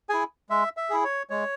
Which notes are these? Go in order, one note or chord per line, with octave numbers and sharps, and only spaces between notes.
E4 G#4 G#5
G#3 E5
E5
E4 G#4
C#5
G#3 C#5